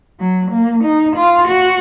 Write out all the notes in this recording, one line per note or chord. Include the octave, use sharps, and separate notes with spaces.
F#3
A#3
D#4
F4
F#4